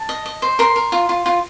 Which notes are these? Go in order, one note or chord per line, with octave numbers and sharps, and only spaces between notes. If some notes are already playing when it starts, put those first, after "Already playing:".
Already playing: A5
D#5
D#5
C5
A#4 C6
A#4
F4
F4
F4